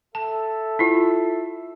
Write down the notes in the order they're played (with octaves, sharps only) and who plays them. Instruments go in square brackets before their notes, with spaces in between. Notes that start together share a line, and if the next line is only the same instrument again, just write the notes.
[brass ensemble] A4 E5 [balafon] A5
[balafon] E4 F4